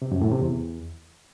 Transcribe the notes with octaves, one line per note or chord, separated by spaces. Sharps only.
C3
F#2
A2
C3
E2